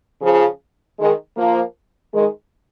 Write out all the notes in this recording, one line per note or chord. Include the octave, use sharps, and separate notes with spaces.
C#3 F3
D#3 G#3
F3 A#3
D#3 G#3